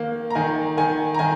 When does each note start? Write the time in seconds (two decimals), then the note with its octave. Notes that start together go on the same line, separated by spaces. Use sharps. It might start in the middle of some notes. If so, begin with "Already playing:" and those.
Already playing: D#3 A#3
0.30 A#5
0.35 D#3 G#5
0.77 D#3 G#5
1.14 A#5
1.19 D#3 G#5